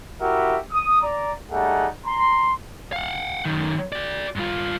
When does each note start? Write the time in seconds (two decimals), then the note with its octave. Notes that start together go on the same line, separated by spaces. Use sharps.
0.21 E4 F#4 G4 A#4 E5
0.72 D#6
1.02 D5 A#5
1.51 G3 A3 D#4 G#4 F#5
2.06 A#5 C6
2.93 F5 F#5
3.45 F#2 D#3
3.93 F#4 D5
4.36 G2 F4